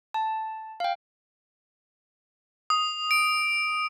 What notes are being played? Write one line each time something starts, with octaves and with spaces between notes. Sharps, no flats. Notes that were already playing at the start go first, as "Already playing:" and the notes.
A5
F5 G5
D#6
D7